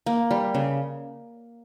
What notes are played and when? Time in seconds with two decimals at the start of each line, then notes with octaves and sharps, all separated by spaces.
0.06 A#3
0.31 G3
0.54 C#3